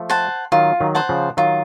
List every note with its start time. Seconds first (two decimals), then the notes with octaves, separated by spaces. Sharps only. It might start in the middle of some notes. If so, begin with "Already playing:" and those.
Already playing: F3 A3
0.10 C5 F#5 A5
0.52 D#3 F#3 F4
0.80 D#3 F#3
0.95 C5 F#5 A5
1.09 C#3 F3
1.37 D#3 F#3 F4